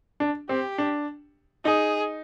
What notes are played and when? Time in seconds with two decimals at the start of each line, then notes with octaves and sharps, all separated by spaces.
0.20 D4
0.49 C4 G4
0.78 D4
1.65 D#4 G#4